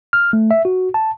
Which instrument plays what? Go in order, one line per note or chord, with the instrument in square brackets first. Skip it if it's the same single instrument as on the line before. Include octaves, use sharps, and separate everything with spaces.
[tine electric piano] F6
A3
E5
F#4
A5